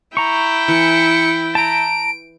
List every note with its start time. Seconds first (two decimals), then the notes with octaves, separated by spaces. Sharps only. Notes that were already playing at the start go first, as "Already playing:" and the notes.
0.17 E4 G5 A#5 C#6
0.68 E3 C#7
1.55 A5 A#5 D7